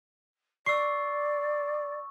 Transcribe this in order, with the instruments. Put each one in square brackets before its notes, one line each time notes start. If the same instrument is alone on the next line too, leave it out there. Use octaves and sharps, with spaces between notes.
[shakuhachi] D5 [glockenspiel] C#6 E6 [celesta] C7